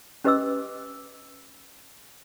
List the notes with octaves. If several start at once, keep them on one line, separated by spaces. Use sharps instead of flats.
C#4 G4 B4 D#5 D6 E6